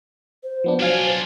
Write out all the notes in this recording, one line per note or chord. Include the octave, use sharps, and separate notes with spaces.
C5
F3 B3 D4
F#3 D4 F4 F5 G#5